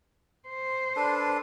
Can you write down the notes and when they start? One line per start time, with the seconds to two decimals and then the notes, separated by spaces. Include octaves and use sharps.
0.48 C5
0.96 D4 A4 B4